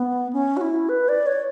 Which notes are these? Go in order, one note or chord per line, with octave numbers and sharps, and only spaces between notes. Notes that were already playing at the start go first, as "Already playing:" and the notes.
Already playing: B3
C#4
F#4
E4
B4
D5
C#5